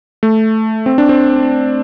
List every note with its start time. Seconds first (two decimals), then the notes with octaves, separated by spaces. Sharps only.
0.23 A3
0.86 C4
0.98 D4
1.09 C4